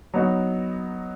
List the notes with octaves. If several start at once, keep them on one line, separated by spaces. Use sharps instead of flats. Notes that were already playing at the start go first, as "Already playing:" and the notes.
F#3 B3 D#4 F#4